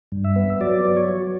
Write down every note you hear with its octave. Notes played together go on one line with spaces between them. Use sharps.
G2
E5
B3
F#3 D5
F#3
C#5
F#3